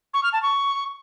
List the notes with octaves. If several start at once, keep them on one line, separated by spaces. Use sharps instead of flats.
C#6
F6
A5
C#6